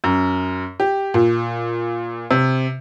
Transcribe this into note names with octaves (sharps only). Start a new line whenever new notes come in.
F#2
G4
A#2
C3